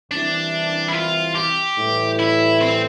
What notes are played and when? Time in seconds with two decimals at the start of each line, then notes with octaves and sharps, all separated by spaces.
0.11 C2 C3 E3 D4
0.89 E4
0.94 F4
1.35 G4
1.77 A2 E3 G3
2.19 E4
2.61 C4